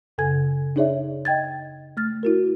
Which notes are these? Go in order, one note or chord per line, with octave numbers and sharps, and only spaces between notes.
F#2 C#3 A4 G#5 G#6
D4 D#4 G#4 C#5 D5 E5
D#5 G5 G#6 A6
A3 F6 A6
E4 F#4 A#4